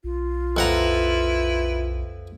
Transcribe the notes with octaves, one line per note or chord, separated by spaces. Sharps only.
B1 F4
F2 E4 B4 F#5 A#5